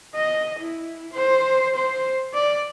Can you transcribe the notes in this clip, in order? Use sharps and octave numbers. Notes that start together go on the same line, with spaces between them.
D#5
E4
C5
C5
D5